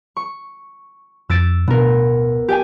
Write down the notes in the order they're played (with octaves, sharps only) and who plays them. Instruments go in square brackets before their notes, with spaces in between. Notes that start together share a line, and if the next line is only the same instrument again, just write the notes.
[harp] C#6
[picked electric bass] F2 [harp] E6 A6 D7
[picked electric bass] D1 B2 D4 [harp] B3 A#4
[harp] G4 G5 G#5